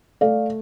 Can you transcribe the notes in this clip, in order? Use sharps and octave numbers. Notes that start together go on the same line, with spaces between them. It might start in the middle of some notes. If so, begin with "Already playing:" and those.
A3 D5 F5